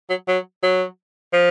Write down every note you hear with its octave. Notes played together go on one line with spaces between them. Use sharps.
F#3
F#3
F#3
F3